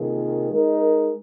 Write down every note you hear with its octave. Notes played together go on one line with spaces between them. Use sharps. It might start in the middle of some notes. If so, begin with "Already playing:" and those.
Already playing: C3 D#3 A#3 F4 G#4
G#3 D#4 A#4